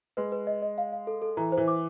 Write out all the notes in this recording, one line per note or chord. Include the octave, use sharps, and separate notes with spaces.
G#3 B4
B4
D#5
D#5
F5
F5
A4
A4
E3 A#5
C5
E3
D6